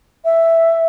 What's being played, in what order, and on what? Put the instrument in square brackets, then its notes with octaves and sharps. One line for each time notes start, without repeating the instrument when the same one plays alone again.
[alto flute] E5